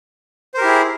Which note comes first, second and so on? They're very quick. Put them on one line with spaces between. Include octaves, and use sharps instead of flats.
C5 A#4 G4 E4 G#4